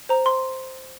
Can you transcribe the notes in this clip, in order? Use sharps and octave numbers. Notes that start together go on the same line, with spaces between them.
C5 A#5
C5 C6